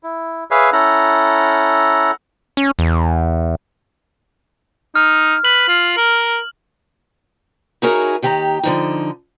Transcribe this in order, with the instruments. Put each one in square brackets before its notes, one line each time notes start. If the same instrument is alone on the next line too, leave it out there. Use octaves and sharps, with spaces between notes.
[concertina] E4
G#4 B4 C#5 E5 F5
C#4 E4 A4 F#5 A#5
[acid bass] C#4
E2
[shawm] D#4 [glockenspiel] F6
[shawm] B4 [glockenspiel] F#7
[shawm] F4
A#4
[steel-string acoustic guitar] D#4 E4 F#4 G#4 A#4 C#5
D#2 D#3 G4 G#4 A#5
D3 F3 D#4